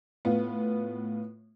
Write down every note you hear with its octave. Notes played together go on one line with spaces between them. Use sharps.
A2 B3 F4